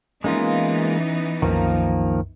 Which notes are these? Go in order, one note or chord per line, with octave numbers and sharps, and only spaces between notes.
E3 G#3 A#3 B3 C#4 D#4 F4
C2 F#2 D#3 F3 A#3